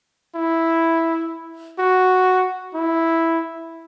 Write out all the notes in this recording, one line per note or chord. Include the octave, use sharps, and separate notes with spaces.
E4
F#4
E4